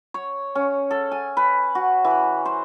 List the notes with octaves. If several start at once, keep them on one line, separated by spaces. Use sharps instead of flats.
C#5
C#4
A4
G#5
B4
F#4
E3
C5